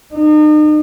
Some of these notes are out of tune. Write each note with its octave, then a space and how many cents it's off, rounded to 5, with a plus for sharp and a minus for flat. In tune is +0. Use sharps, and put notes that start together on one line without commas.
D#4 -40